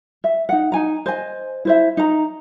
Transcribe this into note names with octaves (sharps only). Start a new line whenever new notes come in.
E5
D#4 F#5
D#4 G#5 A#5
C5 D#5 G#5
E4 C5 E5
D#4 A#5